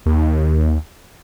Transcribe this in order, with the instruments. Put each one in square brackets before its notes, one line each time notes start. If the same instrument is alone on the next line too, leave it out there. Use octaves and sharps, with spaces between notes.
[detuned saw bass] D#2